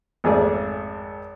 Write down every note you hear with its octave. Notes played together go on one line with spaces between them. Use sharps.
G#1 F2 A3 G#4 D5 G#5